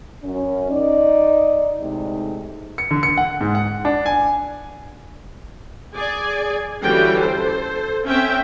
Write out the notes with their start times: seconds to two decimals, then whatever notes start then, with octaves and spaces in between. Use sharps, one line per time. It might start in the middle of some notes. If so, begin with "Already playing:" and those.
0.24 F#2 C#4
0.71 D#4 D5
1.80 A2 C3 G#3 D#4
2.78 C#7
2.91 D3
3.03 C#7
3.17 F#5
3.41 G#2
3.55 F#5
3.85 D4
4.06 G#5
5.95 G#4 D5 G#5
6.83 D3 E3 G3 C#4 F#4 G5
7.19 A4 C5
8.06 C4 C#4 E5 G5